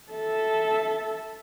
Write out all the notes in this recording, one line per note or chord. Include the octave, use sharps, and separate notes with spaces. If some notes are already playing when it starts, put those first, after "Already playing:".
A4 E5